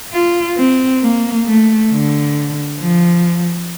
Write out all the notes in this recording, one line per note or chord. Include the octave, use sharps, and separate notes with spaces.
F4
C4
A#3
A3
D3
F3